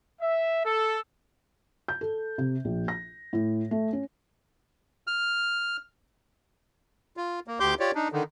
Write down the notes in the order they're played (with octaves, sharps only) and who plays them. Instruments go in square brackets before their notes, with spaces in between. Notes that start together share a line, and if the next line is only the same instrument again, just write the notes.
[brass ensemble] E5
A4
[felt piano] G6
A4
C3
A#1
A#6
A2
A3
C#4
[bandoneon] F6
F4
A#3
D2 G4 C6 D6 G6
F4 G4 C#5 D5
D4 D#4
D3 D#3